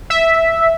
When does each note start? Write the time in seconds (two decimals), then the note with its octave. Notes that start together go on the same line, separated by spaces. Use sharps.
0.10 E5